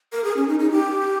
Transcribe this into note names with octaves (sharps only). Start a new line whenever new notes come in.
A#4
G#4
C#4
D#4
D#4
G4